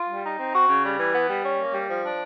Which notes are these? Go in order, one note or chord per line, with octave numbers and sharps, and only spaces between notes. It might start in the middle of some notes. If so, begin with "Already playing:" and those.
Already playing: F4
G3
D#4
C4
F#4
C#3
G3
E3
B3
G3
C#4
A#3
G3
F3
D4